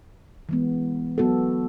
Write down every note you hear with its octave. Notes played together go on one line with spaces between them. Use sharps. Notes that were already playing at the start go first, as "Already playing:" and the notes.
E3 G#3 B3
F#3 B3 F#4 A4